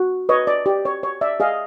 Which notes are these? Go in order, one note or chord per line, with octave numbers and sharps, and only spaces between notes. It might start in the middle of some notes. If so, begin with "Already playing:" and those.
Already playing: F#4
B4 C#5 D#5
D5
G4 D5
C#5
C#5
D5 E5
G#4 D#5 F5